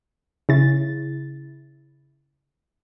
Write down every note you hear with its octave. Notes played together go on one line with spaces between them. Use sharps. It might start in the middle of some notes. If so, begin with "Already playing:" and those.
C#3 E4 A6